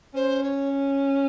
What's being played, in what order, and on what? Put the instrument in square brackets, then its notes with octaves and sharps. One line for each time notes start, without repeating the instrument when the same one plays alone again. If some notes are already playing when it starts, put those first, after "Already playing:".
[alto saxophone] C#4 [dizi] C5
[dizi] C#5